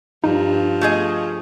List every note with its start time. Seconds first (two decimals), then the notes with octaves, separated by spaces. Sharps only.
0.24 G2 F3 D#4
0.81 A3 G#4 D#5